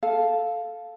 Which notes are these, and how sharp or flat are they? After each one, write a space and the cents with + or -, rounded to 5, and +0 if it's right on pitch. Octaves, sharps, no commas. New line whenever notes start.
A4 -5 F5 +0